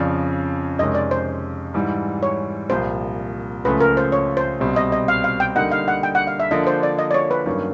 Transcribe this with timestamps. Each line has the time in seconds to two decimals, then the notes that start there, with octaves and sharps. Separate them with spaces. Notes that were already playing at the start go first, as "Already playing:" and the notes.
Already playing: F2 C#3 F3 D5
0.79 F2 C3 D#3 G#3 C#4 D#5
0.95 D5
1.11 C5
1.74 G#2 E3 G3
2.23 C#5
2.70 C2 A#2 F3 C5
3.65 C#2 C#3 F3 A3 B4
3.81 A#4
3.97 C5
4.12 C#5
4.37 C5
4.60 C2 B2 G3 C4
4.76 D#5
4.92 D#5
5.08 F5
5.24 F5
5.40 G5
5.55 D3 G3 A#3 D#4 F#5
5.72 F5
5.88 F#5
6.03 G5
6.15 F#5
6.27 F5
6.40 E5
6.51 D3 F3 A#3 D4 D#5
6.67 C5
6.83 D5
6.99 D#5
7.11 D5
7.14 C#5
7.31 B4
7.46 G2 D#3 F#3 A#3 C#4